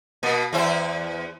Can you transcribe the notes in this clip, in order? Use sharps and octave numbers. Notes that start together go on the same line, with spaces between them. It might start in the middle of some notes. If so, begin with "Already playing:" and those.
B2 A#3
E2 E4 C5